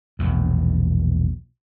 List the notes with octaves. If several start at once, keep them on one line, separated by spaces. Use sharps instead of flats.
E1 A#1 E2